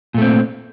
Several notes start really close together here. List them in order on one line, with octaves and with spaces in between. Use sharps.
A#2 A3 C4